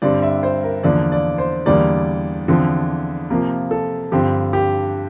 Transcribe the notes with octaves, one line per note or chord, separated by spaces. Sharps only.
G2 D3 G3 C4 D5
E5
C5
A#4
E2 D3 F3 A#3 D5
D5
C5
E2 D3 G3 A#3 D5
E2 D3 F3 C4
C3 F3 A#3 A#4
A4
G2 D3 F3 C4 G4
G4